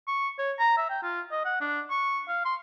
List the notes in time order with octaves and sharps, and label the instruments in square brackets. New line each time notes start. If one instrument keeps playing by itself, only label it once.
[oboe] C#6
C#5
A#5
E5
G5
F4
D#5
F#5
D4
C#6
F5
C6